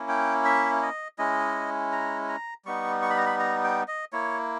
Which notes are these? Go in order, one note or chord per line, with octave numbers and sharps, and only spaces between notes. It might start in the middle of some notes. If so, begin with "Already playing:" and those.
Already playing: A#3 C#4 E4
G5
E5
D#5
G#3 C#4 E4 D#5
A#5
A#5
G3 B3 D#4 C#6
C#6
B5
A#5
B5
A#5
G5
D#5
A#3 E4 C#5